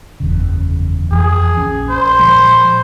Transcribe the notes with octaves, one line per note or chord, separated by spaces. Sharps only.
F#1 E2 C#3
F2 E3 F3 G#4
A#1 C#4
C5
A#2 F3 G#3